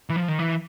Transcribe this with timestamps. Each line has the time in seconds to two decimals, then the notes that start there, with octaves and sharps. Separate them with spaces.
0.10 E3
0.16 F3
0.28 D#3
0.39 E3